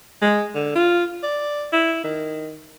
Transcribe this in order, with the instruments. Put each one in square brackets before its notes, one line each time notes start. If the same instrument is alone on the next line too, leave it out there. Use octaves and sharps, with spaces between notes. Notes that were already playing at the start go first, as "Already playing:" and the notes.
[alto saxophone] G#3
D3
F4
D5
E4
D#3